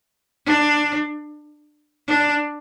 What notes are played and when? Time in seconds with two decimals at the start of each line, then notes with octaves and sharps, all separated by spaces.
0.46 D4
2.07 D4